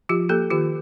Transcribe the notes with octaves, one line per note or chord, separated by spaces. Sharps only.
F3 F4 G4
A#3 G4 A4
D#3 F4 G4